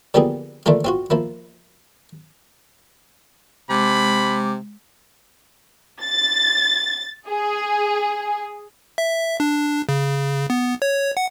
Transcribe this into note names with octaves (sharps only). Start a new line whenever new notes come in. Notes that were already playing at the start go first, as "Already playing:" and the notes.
D3 F3 A#3 B3 G4 G#4
D3 E3 A3 A#3 F4
C4 F4 F#4
F3 A#3 E4
C3 G#3 B5 D6
A6
G#4
E5
D4
C#3
B3
C#5
F#5